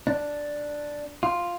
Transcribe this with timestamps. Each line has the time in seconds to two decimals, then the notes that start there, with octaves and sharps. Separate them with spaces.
0.07 D4
1.23 F4